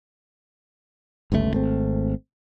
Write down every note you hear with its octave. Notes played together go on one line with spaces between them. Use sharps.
G1 C#2 C3 A3
G#1 A3 C4